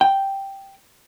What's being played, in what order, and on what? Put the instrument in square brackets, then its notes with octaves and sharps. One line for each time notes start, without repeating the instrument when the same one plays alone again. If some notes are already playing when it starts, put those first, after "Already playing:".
[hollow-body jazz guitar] G5